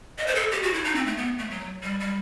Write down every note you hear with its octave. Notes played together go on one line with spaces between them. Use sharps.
D#5
C5
A4
G4
F#4
E4
D#4
C4
A3
B3
A3
F#3
G3
G3